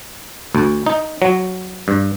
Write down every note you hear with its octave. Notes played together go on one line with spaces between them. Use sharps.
D2
D#4
F#3
G2